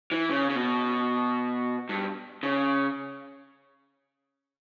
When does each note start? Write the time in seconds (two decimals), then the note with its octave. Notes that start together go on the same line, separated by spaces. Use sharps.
0.11 E3
0.30 C#3
0.49 C#3
0.56 B2
1.89 G2
2.43 C#3